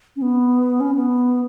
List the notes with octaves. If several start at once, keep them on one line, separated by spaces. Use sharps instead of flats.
C#4
B3
C#4
B3